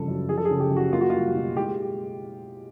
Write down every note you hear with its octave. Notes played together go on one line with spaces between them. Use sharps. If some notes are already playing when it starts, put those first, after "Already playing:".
Already playing: G2 C#3 F3 A4
F#2
F3 G#4
A4
G#4
C#3
G4
F#2
F#4
A#3 F4
F#4
G3 F4
B2
G#3 G4